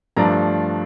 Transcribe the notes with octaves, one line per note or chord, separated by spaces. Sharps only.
G2 F3 A3 D4 A#5